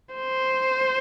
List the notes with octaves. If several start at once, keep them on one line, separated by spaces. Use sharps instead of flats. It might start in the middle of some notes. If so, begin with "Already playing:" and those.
C5